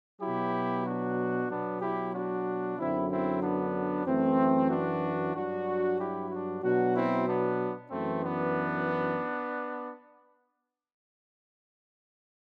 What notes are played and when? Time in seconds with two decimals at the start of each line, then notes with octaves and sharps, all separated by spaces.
0.22 B2 F#3 E4 G4
0.86 D4 F#4
1.50 B2 F#3 B3 D4
1.82 E4 G4
2.14 D4 F#4
2.78 F#2 D3 F#3 C4 E4
3.10 C4 E4
3.42 B3 D4
4.06 F#2 E3 A3 C4
4.70 D4 F#4
5.34 G2 F#3 D4 F#4
5.99 E4 G4
6.30 D4 F#4
6.62 B2 F#3 D4 F#4
6.94 C4 E4
7.27 B3 D4
7.91 F#2 E3 A3 C4
8.23 B3 D4